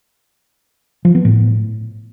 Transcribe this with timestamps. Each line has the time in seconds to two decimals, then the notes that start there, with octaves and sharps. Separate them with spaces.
1.05 F3
1.15 B3
1.25 A2